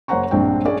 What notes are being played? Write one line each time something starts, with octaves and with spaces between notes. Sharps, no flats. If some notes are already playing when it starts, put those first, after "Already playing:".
F#1 C5 C#5 F#5 A#5 C#6
A#1 G2 C4 D4 G5
C#4 G#4 C#5 D5